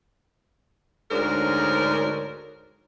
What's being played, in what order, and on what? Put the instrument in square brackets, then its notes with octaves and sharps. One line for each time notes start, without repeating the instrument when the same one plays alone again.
[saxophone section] D2 G#2 D4 A#4 C5 C#5